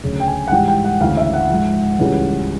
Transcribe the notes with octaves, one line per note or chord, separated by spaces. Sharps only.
D2 C#3 F#3
G5
G#5
F#5
G#2 E3 G3 G5
G5
F#5
D2 C#3 E3 F5
E5
F#5
G#2 F3
C#2 C#3 E3 G3